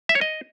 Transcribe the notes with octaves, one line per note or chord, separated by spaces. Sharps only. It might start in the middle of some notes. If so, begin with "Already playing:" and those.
E5
C#5
D#5